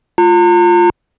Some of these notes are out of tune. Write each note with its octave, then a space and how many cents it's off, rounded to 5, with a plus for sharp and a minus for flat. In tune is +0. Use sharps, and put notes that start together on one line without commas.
F4 +0 A#5 -40